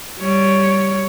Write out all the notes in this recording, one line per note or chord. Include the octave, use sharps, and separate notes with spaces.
G3 C#5